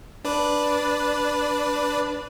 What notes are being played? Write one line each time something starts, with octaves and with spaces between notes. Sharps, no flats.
D4 B4 D5